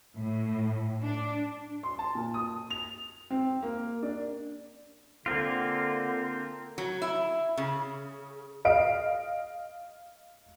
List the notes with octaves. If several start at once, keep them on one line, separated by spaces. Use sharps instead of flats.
A2
D4
C6
A5
A#2
D#6
F7
C4
A#3
D4
D3 A#3 C4 F4
F#3
E4
C#3
D#5 F5 D7